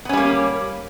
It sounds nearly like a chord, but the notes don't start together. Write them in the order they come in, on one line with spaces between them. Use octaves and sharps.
B3 C#4 G3 A#3